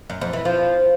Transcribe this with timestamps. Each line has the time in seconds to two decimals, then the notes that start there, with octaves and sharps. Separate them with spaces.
0.10 F#2
0.21 F2
0.33 E3
0.45 F3